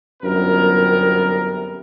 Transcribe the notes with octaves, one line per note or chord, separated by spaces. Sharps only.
G1 F#2 C3 B3 A#4